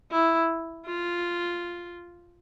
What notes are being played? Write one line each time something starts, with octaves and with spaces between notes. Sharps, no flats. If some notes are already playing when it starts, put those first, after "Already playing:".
E4
F4